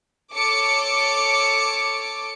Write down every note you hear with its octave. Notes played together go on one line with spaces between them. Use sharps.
A4 C#5 D6 C#7